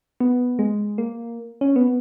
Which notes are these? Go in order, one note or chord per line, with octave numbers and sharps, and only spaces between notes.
B3
G#3
A#3
C#4
B3